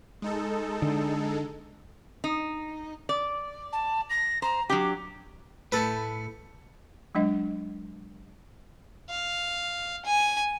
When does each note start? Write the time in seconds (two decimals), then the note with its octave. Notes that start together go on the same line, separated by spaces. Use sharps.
0.22 G#3 D#4 A4
0.82 D3
2.24 D#4
3.09 D5
3.73 A5
4.10 A#6
4.42 C5 A#5
4.70 F#3 D4 G4 D6
5.72 A2 A3 A4 B4
7.15 F#3 G#3 D4 D#5
9.10 F5
10.05 G#5